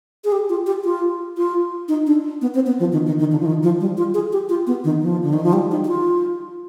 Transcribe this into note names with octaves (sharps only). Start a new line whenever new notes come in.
G#4
G4
F4
G4
F4
F4
D#4
D4
B3
C4
B3
F3
D#3
D#3
D#3
D3
F3
D#3
F3
G3
F4
G#4
G4
F4
B3
D#3
F3
D3
D#3
F3
G3
D#4
G4
F4